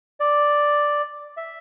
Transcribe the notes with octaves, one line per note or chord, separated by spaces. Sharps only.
D5
E5